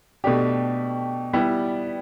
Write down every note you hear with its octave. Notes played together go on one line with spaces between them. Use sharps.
B2 A3 D4 G4
G3 B3 E4 G4